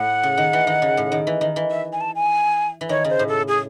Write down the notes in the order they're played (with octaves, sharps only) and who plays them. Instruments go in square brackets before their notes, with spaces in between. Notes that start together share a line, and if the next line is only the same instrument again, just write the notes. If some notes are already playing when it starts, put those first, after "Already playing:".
Already playing: [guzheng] A2 [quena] F#5
[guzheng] C#3
D#3
E3
D#3
C#3
A2
D#3
E3
D#3
E3
[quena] E5
G#5
A5
G#5
[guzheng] E3
[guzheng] D#3 [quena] C#5
[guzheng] C#3
[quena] C5
[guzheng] A2
[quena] A4
G#4